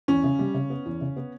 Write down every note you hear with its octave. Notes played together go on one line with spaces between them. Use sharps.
E2 C#4
C#3
G3
C#3
B3
E2
C#3
B3